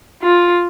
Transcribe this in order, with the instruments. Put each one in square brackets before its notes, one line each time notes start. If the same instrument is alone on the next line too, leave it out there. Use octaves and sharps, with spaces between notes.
[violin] F4